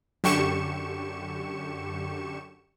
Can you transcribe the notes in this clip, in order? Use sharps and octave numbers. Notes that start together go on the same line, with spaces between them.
F#2 D3 G4 C#6 C#7 E7